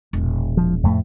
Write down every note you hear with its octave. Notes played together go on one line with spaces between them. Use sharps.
E1 A#1
F3
F2 A2 A3